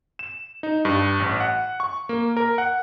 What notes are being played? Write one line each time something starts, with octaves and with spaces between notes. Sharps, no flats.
E7
D#4
G2
A1
F#5
C#6
A#3
A#4
F#5